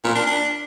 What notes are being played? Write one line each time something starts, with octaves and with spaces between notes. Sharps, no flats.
A#2
D4
D4